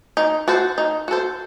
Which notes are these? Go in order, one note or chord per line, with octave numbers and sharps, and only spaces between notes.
D#4
F#4 A4 C5
D#4
F#4 A4 C5